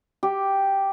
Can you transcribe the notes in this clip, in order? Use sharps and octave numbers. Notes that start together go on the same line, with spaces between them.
G4